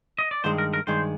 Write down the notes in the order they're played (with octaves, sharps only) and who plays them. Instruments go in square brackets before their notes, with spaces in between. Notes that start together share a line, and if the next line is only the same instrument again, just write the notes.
[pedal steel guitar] D#5
D5
[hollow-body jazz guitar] G2 D#3 G#3 [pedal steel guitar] C5
[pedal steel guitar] A#4
A#4
[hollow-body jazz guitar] G2 D#3 G#3 [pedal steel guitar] C5